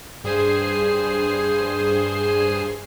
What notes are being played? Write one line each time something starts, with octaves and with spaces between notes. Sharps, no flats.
G2 G#4 C5 G#5 C7